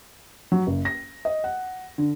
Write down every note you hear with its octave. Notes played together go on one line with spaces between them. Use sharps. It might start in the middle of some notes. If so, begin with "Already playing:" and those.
F#3
F#1
A#6
D#5
F#5
D3